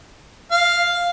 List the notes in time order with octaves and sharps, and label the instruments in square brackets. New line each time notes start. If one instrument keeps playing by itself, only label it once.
[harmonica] F5